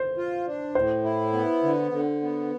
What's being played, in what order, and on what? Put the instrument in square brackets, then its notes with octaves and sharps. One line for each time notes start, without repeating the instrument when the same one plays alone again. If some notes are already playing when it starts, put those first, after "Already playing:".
Already playing: [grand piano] C5
[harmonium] F4
D4
[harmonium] A2 [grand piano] C5
[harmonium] E4
B3
D3
D3
B3